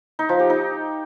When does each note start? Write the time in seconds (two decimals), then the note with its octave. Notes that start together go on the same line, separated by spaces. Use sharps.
0.19 D#4
0.29 F3
0.40 G4
0.50 D#4